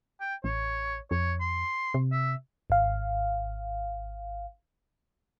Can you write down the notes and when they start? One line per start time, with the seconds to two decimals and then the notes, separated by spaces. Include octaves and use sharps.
0.21 G5
0.44 A1 C#5
1.11 F2 C#5
1.41 C6
1.94 C3
2.12 E5
2.70 G#1 F5